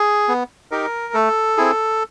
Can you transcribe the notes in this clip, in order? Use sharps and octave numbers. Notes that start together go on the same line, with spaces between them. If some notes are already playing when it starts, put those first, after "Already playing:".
Already playing: G#4
B3
D#4 G4 A#4
A3 A4
C4 E4 G#4